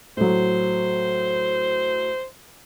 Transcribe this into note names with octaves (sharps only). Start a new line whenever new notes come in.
A2 F#3 C5